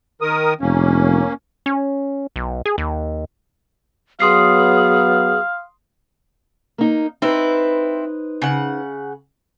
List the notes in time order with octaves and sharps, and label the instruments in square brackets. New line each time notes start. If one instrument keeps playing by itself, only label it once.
[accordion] D#3 A#4 D#6
[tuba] F1 [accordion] A#3 C#4
[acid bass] C#4
B1
G#4
D#2
[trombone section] F#3 B3 [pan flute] G#4 [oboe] F5 [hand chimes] C6 D#6 C7
[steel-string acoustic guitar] A#3 D#4
[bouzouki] C4 E4 [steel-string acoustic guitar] D#4 B4 C5
[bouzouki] C#3 F#5